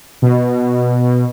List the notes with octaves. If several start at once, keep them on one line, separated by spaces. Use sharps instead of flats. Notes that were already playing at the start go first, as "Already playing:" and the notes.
B2